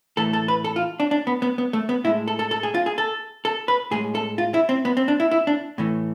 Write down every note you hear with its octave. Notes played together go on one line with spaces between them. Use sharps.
A2 E3 A3 A4
A4
B4
A4
F4
D4
D4
B3
B3
B3
A3
B3
A2 G#3 E4
A4
A4
A4
G#4
F4
G#4
A4
A4
B4
A2 G#3 G#4
A4
F4
E4
C4
B3
C4
D4
E4
E4
D4
A2 E3 A3